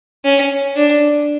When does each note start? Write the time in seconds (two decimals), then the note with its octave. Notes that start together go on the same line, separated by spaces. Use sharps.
0.25 C#4
0.76 D4